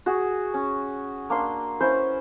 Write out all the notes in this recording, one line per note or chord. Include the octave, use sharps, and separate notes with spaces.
F#4 G#4
C#4
A#3 D4 C6 E6
C#4 E4 B4 C5